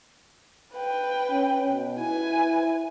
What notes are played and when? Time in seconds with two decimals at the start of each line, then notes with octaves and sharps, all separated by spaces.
0.73 B4 G5
1.31 C#4
1.70 B2
1.99 E4 B4 G#5